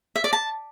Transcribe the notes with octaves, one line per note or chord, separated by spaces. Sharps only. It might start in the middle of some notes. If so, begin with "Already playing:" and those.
E5
D5
A5